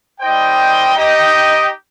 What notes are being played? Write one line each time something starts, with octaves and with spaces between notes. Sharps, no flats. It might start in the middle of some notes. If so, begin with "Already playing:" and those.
G3 D#4 C5 D#5 G5
D#4 G4 D#5 G5